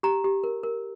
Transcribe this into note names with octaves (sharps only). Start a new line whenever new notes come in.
G4 A#5
G4
A#4
A#4